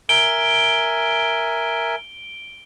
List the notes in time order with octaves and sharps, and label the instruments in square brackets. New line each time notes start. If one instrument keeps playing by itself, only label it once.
[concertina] A#4 E5 G#5 [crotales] D7 G7